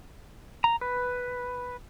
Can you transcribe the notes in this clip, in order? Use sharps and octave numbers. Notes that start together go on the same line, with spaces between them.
A#5
B4